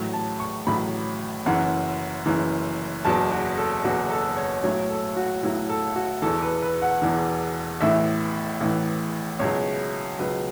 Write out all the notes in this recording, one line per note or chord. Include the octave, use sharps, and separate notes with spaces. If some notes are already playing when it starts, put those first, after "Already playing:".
Already playing: A1 A2 F#3
A5
C#6
A1 A2 F#3 B5
F#1 F#2 E3 F#5
F#1 F#2 E3
F#1 E2 B2 F#3 A5
F#4
A4
F#1 E2 B2 F#3 F#4
A4
C#5
B1 A2 F#3 C#5
A4
F#4
B1 A2 F#3 E4
A4
F#4
E1 E2 E3 A4
B4
B4
F#5
E1 E2 E3
A1 A2 E3 E5
A1 A2 E3
C#2 B2 F#3 C#5
C#2 B2 F#3 B4